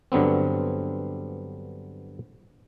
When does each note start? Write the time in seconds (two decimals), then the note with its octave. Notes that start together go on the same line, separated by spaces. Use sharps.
0.12 G2 D3 F#3 B3 C4